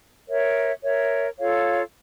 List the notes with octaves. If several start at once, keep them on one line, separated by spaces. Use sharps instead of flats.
A#4 C#5 E5
A#4 C#5 E5
F4 A4 C#5 F5